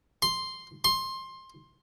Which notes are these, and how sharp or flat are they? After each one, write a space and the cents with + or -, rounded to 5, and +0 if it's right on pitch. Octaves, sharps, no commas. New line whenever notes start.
C6 +0
C6 +15